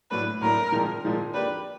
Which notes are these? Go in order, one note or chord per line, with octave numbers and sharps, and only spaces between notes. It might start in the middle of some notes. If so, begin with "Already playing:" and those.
A2 F#3 A3 D4 B4
A2 F#3 A3 D4 A#4
A#2 F3 G#3 C4
A#2 F3 G#3 C4
A#3 D4 G4 B4